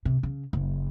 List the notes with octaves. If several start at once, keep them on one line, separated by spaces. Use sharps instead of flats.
C3
C#3
F#1